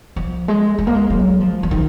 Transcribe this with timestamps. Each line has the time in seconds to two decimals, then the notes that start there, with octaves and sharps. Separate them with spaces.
0.16 F3
0.48 G#3
0.78 G#3
0.87 A#3
0.95 G#3
1.10 F#3
1.40 F3
1.63 F3
1.71 D#3